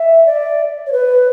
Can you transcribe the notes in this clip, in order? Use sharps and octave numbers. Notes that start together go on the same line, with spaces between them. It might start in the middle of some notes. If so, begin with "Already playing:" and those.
Already playing: E5
D5
C#5
B4